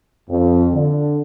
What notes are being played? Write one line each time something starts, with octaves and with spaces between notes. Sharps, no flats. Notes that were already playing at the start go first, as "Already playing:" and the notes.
F2
D3